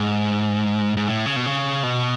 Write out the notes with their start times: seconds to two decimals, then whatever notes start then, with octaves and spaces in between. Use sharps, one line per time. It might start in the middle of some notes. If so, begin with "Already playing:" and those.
Already playing: G#2
0.97 G#2
1.08 A2
1.26 C#3
1.36 B2
1.46 C#3
1.83 B2